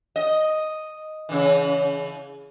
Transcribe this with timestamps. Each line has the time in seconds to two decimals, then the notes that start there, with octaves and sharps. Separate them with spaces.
0.16 D#5
1.29 C#3 E3